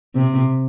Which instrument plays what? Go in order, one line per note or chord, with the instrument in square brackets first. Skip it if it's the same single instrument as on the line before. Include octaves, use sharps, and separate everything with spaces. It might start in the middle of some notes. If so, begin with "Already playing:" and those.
[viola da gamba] C3